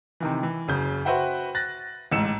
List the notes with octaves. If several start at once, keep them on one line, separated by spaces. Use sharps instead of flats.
C3 D#3 E3
E3
F#1 C#3 G6
F#4 B4 C5 E5 F#5 G5
F#6 A6 A#6
A1 G#2 E6 C#7 E7